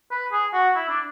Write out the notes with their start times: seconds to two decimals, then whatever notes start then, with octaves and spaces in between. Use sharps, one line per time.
0.11 B4
0.32 G#4
0.53 F#4
0.76 E4
0.89 D4